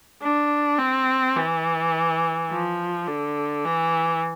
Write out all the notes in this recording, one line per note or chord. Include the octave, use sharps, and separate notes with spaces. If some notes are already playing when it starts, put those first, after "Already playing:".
D4
C4
E3
F3
D3
E3